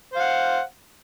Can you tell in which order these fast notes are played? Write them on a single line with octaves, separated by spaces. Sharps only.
C5 F5 F#5